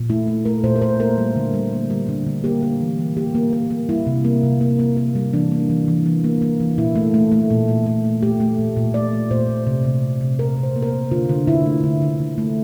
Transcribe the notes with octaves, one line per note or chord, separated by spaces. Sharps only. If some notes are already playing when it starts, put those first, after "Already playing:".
Already playing: A#2
A3 E4
A3
A3 A#4
A#2 C5
A#4
A3 C5
A#3 A#4
G3
D3
G3
A#3
G3
D3
D3
A#3 G4
A#3
E3
E3
A#3 G4
A#3
A#3
A#3
G3 E4
C3
A#3
C3
A#3
A#3
A#3
G3
E3 D4
A#3
E3
E3
E3
A#3
A#3
E3
A#2 E4
A3
A3
A3
A#2
A#2
A3
A3
A3 G4
A3
A#2
A#2
A3 D5
A3
A#2 C5
A#2
C3
C3
C3
C3
C3 A#4
C3
C5
A#3
A#4
C5
A#3
D3 F4
D3
D3 E4
A3
D3
D3
D3
A3